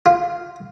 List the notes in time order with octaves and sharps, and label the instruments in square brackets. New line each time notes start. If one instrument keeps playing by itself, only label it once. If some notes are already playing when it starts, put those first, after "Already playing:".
[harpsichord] F4